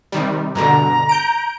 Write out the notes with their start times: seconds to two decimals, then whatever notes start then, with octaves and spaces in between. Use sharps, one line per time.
0.12 C3 D#3 G3
0.55 G2 B2 D3 A#5
1.09 G6 D7